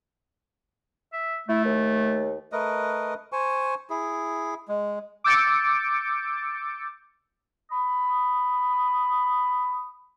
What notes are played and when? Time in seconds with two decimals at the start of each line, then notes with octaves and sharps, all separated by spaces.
1.13 E5
1.49 A3 E4
1.64 D#2
2.52 A3 A#4 B4 D#5
3.32 C5 G#5 C#6
3.90 E4 G#4
4.68 G#3
5.24 D6 E6 G6 A6 C#7 D7
7.71 B5 D#6